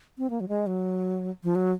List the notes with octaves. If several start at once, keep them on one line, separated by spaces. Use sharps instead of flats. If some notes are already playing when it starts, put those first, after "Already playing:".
C4
A#3
F#3
G#3
F#3
F3
F#3